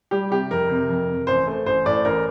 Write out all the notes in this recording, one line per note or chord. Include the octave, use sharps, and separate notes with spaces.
G3 G4
C3 G4
F2 A#4
C3
F2
C3
A1 C5
A3
A1 C5
A2 D5
A1 A#4